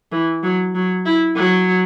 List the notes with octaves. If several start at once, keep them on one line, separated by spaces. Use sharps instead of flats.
E3
F#3
F#3
E4
F#3